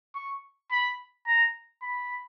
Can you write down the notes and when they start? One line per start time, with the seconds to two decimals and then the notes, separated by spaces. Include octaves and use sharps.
0.15 C#6
0.72 B5
1.27 A#5
1.82 B5